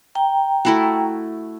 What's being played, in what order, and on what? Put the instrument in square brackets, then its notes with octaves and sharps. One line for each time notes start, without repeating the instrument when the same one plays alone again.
[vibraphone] G5 A#5
[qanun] A3 E4 F#4